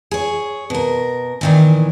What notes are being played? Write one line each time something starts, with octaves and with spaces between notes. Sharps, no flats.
G#4 C#5
B2 A#4
A#2 D#3 E3